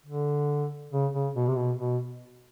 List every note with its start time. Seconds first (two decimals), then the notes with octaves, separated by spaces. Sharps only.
0.06 D3
0.91 C#3
1.13 C#3
1.35 B2
1.47 C3
1.56 B2
1.77 B2